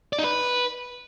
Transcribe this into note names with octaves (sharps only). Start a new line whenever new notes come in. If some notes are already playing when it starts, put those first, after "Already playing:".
D5
D#4
B4